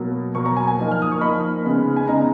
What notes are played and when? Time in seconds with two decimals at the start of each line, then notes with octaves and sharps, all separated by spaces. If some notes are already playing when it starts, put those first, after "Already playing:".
Already playing: B2 F#3 A#3
0.35 B2 F#3 A#3 C#6
0.46 A#5
0.57 G#5
0.67 G#5
0.78 F3 A#3 D#4
0.92 F6
1.02 D#6
1.12 C#6
1.21 F3 A#3 D#4 B5
1.65 C#3 G#3 B3 D#4
1.97 G#5
2.08 C#3 G#3 B3 D#4 A#5